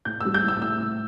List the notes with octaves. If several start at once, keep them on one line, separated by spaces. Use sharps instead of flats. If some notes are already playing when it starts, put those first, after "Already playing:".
A2 G6
G3 E6
G6
A2 E6
A2 E6
A2